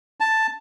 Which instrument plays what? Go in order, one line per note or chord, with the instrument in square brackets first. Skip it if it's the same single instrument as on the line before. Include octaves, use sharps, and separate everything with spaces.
[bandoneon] A5